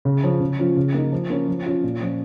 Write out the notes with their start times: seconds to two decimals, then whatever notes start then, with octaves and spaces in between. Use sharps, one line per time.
0.05 C#3
0.23 F3 C#4
0.40 C#3
0.59 F3 C#4 F4
0.77 C#3
0.94 A#3 D#4
1.12 F3
1.30 A#3 C#4
1.48 F3
1.66 C#4 F4
1.84 A#2
2.01 F3 C#4